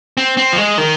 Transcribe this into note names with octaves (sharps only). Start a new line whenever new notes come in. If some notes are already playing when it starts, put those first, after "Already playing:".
C4
C4
F3
G#3
D#3